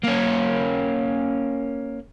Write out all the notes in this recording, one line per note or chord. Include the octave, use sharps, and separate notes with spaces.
A#3 C#4